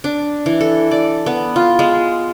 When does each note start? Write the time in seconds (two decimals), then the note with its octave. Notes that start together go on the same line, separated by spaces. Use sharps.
0.04 D4
0.46 E3
0.61 A4
0.91 D5
1.26 B3
1.56 F4
1.79 G#3